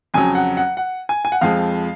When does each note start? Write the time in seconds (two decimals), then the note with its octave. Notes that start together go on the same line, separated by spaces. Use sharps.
0.14 F2 C#3 F#3 G#5
0.35 F#5
0.57 F#5
0.77 F#5
1.09 G#5
1.25 G#5
1.32 F#5
1.41 F2 F3 G#3 F5